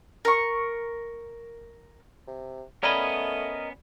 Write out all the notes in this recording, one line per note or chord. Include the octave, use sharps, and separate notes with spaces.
A#4 C#6
C3
A3 B3 C#4 A#4 D5 D#5 G5 B5